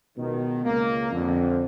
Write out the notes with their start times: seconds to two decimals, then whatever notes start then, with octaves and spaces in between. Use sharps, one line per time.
0.17 C#2 B2 D#3
0.63 C#2 A#3
1.11 F2 D3